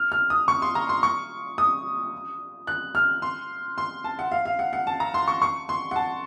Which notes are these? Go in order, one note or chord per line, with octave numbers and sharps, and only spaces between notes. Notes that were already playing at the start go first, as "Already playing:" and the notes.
Already playing: F6
F6
D#6
C#6
C6
A#5
C6
C#6
D#6
F#6
F6
C6
C6
A5
F#5
F5
F5
F#5
F#5
A5
A#5
C6
C#6
C#6
C6
F#5
A5